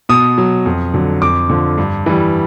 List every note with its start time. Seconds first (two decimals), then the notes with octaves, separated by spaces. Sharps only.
0.09 B2 D#6
0.38 F#3
0.66 F2
0.94 D3 F#3
1.22 F2 D6
1.49 D3 F3
1.78 G2
2.06 E3 G3